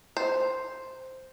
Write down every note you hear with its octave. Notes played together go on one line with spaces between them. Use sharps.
C5